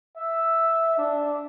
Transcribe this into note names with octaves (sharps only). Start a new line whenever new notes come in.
E5
D4